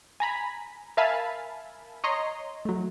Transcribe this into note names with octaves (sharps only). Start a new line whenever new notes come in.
G#5 A#5 B5
A#4 E5 F5 G#5 A5 B5
C#5 D#5 A#5 C6
F#3 A3